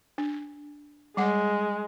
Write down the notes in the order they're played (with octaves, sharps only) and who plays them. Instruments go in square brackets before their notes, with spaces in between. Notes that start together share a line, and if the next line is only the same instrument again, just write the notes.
[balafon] D4
[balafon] G3 F#5 [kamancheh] G#3